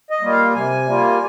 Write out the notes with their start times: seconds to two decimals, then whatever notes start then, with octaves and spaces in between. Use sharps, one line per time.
0.10 D#5
0.21 G3 A#3 F4
0.32 F5
0.54 C3 G#5
0.86 G3 A#3 F4